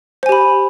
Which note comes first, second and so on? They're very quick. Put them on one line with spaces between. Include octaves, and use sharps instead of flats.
C5 G#5 G4 B5